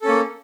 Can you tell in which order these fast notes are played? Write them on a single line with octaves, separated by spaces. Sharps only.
A4 C#4 A#3